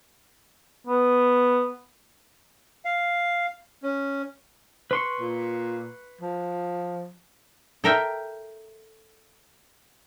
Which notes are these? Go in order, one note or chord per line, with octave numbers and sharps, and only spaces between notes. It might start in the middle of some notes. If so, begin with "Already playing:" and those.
B3
F5
C#4
B4 C6 C#6
A#2
F3
A4 A#4 E5 G5